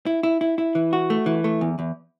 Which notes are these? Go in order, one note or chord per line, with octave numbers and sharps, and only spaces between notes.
E4
E4
E4
E4
E3
F#4
A3
E3
A3
E2
E2